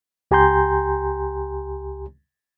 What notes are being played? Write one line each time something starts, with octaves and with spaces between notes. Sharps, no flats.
C#2 G4 G#5 A#5 C6 G6